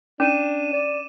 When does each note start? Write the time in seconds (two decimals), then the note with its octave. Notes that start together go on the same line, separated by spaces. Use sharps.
0.20 C#4 D4 D6 D#7 E7
0.73 D5